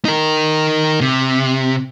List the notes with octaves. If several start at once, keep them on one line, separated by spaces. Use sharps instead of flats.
D#4 A#4
C3